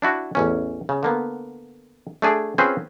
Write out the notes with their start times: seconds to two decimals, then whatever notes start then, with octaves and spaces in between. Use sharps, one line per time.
0.02 D4 E4 F#4
0.35 A1 E2 C#4
0.89 C#3
1.03 D3 A#3 B3
2.22 A3 D4 G#4
2.58 C4 C#4 F4 G#4 B4 C5